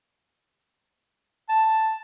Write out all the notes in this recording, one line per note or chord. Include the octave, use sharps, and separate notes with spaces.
A5